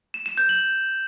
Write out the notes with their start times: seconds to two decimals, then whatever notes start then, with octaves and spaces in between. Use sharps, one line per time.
0.14 E7
0.26 E7
0.37 G6
0.49 F#7